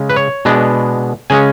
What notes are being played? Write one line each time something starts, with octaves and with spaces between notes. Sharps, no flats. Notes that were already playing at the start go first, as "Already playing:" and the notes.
Already playing: C#3 G#3 C#4
B4
C#5
B2 G#3 B3 D4
C#3 G#3 C#4 G#5